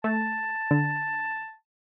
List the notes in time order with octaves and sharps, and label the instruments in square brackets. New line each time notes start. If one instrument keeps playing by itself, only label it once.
[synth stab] A3 [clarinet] A5
[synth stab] D3